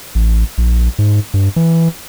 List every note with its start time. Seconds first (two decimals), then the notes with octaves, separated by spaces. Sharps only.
0.15 A1
0.58 A#1
0.99 G#2
1.34 G2
1.56 E3